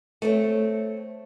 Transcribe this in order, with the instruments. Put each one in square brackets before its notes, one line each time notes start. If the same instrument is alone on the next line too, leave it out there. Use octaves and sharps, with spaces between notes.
[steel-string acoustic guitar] A3 C4 C#5